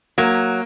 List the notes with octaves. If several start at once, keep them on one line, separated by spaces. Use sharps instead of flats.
F#3 A#3